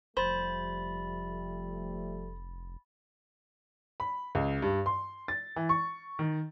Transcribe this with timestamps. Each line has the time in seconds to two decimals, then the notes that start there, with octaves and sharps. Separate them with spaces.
0.17 F1 F3 G3 A3 C5 B5 A6
4.00 B5
4.35 C#2
4.62 G2
4.86 C6
5.28 A6
5.56 E3
5.69 C#6
6.19 D#3